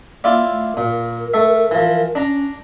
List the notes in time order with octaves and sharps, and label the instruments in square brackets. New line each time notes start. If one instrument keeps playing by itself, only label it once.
[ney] A#3 [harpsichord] E4 F4 D5
[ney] A3
[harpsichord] A#2 [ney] A#4
[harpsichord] A3 E5
E3 F3
[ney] C#4 [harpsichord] D4 A#5